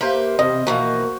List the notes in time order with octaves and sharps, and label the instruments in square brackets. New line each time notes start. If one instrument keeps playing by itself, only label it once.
[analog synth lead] A#3 [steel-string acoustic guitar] G4 B4 E5 [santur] C5 F5
[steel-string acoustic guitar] E2 [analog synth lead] C3 [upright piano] D#5
[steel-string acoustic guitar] B2 E3 F3 [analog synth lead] A#3 [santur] F#4